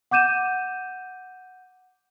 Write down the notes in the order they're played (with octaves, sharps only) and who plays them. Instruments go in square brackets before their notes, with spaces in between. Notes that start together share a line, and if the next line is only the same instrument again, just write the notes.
[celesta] F#5 D6 G6 D#7 E7